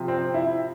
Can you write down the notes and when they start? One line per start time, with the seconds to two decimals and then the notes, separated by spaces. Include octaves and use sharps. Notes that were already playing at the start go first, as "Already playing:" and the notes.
Already playing: C3 F3
0.08 C4
0.34 E4